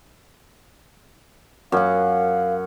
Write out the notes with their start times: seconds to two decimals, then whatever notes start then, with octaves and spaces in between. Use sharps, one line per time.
1.72 F#2 F5 F#5